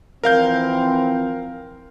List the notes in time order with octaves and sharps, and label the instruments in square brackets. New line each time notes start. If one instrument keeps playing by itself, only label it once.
[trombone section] E3 F3 C4 [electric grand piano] A#4 F5 G6